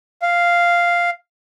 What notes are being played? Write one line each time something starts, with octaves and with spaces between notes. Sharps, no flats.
F5